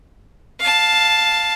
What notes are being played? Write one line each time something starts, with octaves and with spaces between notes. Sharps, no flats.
F5 A5